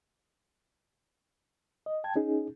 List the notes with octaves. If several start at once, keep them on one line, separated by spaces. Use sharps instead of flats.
D#5
G5 A5 G#6
C#4 D#4 G#4